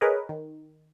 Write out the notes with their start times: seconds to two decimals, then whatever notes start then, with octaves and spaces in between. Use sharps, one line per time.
0.01 G#4 A#4 B4 C#5 D#5
0.29 D#3